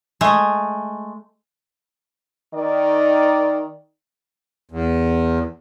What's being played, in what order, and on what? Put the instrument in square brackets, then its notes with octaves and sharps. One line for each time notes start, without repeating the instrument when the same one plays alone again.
[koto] G#3 A3
[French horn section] D#3 D5
[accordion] E2